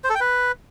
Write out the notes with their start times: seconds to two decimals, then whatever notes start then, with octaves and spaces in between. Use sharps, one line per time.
0.04 C5
0.09 A4
0.15 G5
0.20 B4